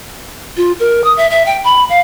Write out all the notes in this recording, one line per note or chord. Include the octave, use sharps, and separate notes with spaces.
F4
A#4
D#6
E5
E5
G5
B5
F5